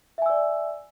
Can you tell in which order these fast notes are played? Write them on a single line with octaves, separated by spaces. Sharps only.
E5 G#5 E6 D5